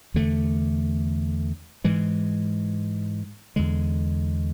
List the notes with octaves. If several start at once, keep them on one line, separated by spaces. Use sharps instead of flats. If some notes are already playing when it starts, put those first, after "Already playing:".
E2 D3 A3
G#2 E3 G#3
E2 D3 G#3